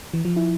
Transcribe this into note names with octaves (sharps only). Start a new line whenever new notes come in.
E3
F3
E4